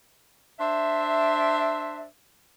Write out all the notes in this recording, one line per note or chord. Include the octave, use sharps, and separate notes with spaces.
D4 C5 E5